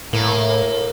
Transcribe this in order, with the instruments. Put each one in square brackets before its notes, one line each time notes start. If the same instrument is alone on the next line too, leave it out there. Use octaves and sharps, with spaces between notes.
[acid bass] A2 [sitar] A#3